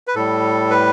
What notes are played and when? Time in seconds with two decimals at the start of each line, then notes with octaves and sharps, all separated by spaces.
0.07 B4
0.16 A2 G3 A4
0.71 B4